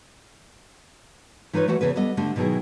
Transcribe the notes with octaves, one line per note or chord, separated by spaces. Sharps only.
E3 D#4 F4 B4 C#5
E3 A3 F#4 F#5
E2 C#3 G#4 B4
G3 B3 A4 D#5
D3 A3 G4
B2 D#3 F#3 E4 G#4